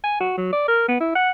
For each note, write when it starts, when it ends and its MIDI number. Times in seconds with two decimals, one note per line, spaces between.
0.04 0.19 80
0.20 0.33 66
0.37 0.48 54
0.53 0.66 74
0.68 0.85 70
0.88 1.00 59
1.00 1.14 64
1.15 1.31 78